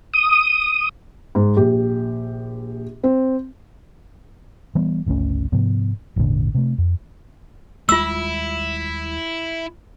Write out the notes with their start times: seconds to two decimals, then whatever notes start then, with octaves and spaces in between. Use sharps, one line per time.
0.14 D#6
1.35 G#2
1.57 A#1 G4
3.03 C4
4.75 E3 G3 B3
5.06 G1 C#2 A3 C#4
5.52 G#2 C3 F3 B3
6.16 G#1 E2 A#2 D3
6.55 C3 A3
6.78 F2
7.89 D#2 G3 G#3 E4 F4 E6